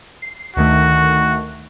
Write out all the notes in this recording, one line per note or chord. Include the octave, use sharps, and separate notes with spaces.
C7
D2 D#3 A3 F#4